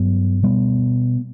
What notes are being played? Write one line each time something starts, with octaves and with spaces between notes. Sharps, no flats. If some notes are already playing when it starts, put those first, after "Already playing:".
Already playing: G2 F#3 B3
B2 G3 B3